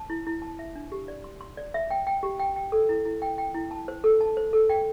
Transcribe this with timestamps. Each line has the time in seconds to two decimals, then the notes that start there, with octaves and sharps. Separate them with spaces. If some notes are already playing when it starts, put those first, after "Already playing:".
Already playing: A5
0.10 E4
0.27 E4
0.42 A5
0.59 E5
0.76 D4
0.92 G4
1.08 D5
1.24 C6
1.41 C6
1.57 D5
1.74 E5
1.91 G5
2.07 G5
2.23 G4
2.39 G5
2.56 G5
2.72 A4
2.89 E4
3.05 E4
3.22 G5
3.38 G5
3.55 E4
3.71 A5
3.88 C5
4.04 A4
4.21 A5
4.37 C5
4.53 A4
4.70 G5